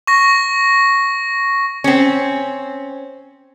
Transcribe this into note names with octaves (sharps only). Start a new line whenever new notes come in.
C#6 A#6
C4 C#4